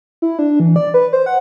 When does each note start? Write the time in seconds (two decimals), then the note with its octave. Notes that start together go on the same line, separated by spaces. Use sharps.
0.22 E4
0.39 D4
0.60 E3
0.76 D5
0.94 B4
1.13 C5
1.26 F#5